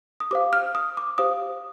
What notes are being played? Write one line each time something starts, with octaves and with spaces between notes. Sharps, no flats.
D#6
G4 C5 F5 D6
F6
D#6
D6
G4 C5 F5 D#6